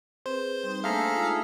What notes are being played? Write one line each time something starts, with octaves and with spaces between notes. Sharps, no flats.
C4 G#4 B4 C5
G3 D#4
A3 A#3 D4 G#4 A4 E5 F5 A#5
G#3 D#4 F4